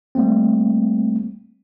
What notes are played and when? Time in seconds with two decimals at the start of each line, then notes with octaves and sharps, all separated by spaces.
0.15 G3 A3 A#3 C4